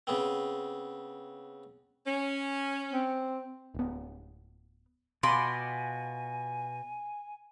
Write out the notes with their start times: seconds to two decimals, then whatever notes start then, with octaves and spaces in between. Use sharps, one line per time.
0.07 C#3 B3 C4
2.07 C#4
2.93 C4
3.74 D1 B3
5.23 B2 F4 G#5 B5 C6 D6